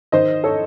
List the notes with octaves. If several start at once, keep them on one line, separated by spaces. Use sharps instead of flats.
D#3 C5 D#5
A4 C#5